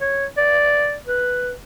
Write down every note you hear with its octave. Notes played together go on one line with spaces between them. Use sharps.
C#5
D5
B4